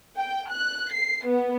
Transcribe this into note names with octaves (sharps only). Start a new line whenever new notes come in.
G5
F#6
C7
B3